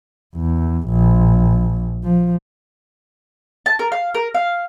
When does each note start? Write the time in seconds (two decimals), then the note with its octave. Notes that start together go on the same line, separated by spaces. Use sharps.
0.36 E2
0.89 A#1
2.04 F3
3.66 A5
3.79 A#4
3.92 F5
4.15 A#4
4.35 F5